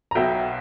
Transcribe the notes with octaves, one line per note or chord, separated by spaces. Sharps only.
A#5
B1 B2 F#3 E5 G5